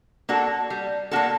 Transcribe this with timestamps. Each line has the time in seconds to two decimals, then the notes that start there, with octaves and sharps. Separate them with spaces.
0.29 A#3 D4 F#4 A4
0.70 G3
1.11 A#3 D4 F#4 A4